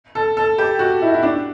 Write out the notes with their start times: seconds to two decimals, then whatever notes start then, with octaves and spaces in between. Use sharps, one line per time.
0.15 A4
0.37 A4
0.58 G4
0.79 F#4
1.02 E4
1.14 E4
1.23 D4